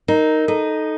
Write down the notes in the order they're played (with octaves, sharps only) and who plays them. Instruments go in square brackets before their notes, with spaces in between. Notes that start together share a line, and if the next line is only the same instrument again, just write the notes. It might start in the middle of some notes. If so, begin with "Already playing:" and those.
[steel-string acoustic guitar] D#4 [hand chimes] A#4
[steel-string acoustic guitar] D#4 [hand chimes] A4